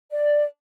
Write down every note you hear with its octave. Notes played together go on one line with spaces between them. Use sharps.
D5